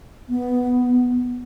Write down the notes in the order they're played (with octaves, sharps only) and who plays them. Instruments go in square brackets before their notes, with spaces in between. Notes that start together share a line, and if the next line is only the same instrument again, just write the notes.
[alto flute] B3